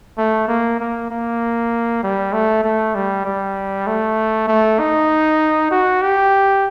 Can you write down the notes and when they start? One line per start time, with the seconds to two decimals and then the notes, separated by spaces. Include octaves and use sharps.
0.18 A3
0.48 A#3
0.80 A#3
1.10 A#3
2.03 G3
2.33 A3
2.64 A3
2.95 G3
3.25 G3
3.87 A3
4.48 A3
4.79 D#4
5.71 F#4
6.02 G4